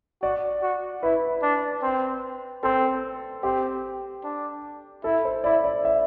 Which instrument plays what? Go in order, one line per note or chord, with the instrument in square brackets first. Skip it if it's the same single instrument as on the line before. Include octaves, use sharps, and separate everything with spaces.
[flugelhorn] F#4 [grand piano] D5
[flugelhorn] F#4
[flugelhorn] E4 [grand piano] B4
[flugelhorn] D4
C4
[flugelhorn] C4 [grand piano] A4
[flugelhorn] C4 [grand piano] G4
[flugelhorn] D4
[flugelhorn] E4 [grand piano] A4
[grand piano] C5
[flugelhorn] E4 [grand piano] D5
[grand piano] D5
E5